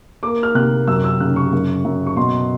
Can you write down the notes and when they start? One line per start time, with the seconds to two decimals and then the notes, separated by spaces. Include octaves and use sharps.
0.23 A#3 D6
0.43 F6
0.55 C3 F#6
0.87 F#2 E6
1.04 E6
1.20 C#3 F#6
1.36 C#6
1.52 F#2
1.85 F#2
2.07 C#6
2.17 B2 C6